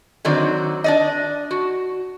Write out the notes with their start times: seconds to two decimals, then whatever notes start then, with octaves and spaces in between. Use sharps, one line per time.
0.25 D3 D#3 F#3 C4 D5
0.84 D4 D5 D#5
1.51 F#4